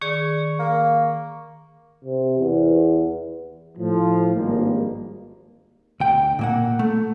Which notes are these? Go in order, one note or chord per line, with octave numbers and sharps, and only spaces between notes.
D#3 G#4 D5 C#6
A#3
C3
E2
A2 F3
G#1 G2 G#3 A#3
D2 G5
A#2 A#3 F#5
A3